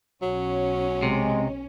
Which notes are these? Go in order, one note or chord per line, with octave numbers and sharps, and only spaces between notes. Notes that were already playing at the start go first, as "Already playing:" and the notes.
B1 F#3 C#4
C3 G#3